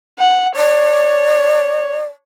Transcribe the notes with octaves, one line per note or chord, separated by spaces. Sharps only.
F#5
C#5 D5